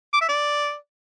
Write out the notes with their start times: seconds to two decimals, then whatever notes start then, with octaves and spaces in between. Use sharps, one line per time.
0.14 D6
0.21 E5
0.29 D5